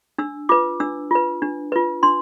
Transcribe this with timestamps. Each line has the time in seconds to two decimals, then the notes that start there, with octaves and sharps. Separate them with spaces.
0.18 D4 E6
0.49 F4 B4 D6
0.80 D4 E6
1.11 F4 B4
1.42 D4
1.72 F4 B4
2.03 D4 C6